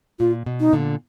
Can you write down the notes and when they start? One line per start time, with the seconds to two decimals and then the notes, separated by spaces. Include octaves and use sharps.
0.19 A#2 F4
0.46 B2
0.60 D#4
0.73 A#2 D3